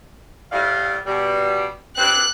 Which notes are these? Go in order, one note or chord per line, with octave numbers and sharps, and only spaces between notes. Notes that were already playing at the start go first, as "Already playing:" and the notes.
A2 G3 F5
B2 G3
G2 C4 F#6